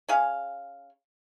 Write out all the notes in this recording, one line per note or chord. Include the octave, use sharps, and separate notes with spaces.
C#4 G#4 F5